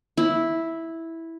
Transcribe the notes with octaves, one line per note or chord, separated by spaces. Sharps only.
E4